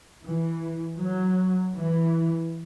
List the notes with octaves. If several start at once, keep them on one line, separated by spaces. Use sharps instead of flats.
E3
F#3
E3